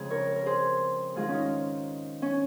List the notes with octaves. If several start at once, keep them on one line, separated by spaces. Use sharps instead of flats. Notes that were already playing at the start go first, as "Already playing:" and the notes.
Already playing: F2 C#3 G#3 G#4
A#4 C#5
A#4
G#4 C5
G#2 D#3 G#3 F4 G#4
C#4
D#4
C#4